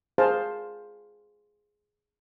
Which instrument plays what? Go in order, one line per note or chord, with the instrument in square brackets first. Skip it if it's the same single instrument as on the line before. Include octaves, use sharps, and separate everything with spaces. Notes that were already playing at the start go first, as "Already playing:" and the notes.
[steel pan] G#4 C5 F5 A5